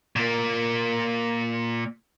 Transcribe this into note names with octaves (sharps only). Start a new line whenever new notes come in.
A#2 A#3